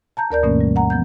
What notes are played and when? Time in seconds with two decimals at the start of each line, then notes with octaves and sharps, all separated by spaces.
0.17 A5 A#5 G6
0.30 D2 A#4 D5 G6
0.43 G2 B2 E3 A3 A#3 C#4
0.61 G3
0.76 F#5 A#5
0.90 F3 B3 G6